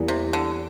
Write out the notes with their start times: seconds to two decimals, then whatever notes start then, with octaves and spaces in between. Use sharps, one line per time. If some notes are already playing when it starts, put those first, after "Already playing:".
Already playing: E2 E3 G3 A#3
0.08 C3
0.33 D3